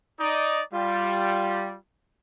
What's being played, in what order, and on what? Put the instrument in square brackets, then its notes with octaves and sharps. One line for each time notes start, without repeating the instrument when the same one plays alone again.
[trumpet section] D#4 D5
[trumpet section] G3 [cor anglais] F4